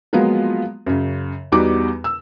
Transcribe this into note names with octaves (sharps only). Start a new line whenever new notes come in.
F3 F#3 G#3 A#3 B3 F4
F#2 C#3
E2 G3 B3 D#4 F#4 D6
E6